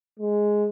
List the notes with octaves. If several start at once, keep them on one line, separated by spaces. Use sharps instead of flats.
G#3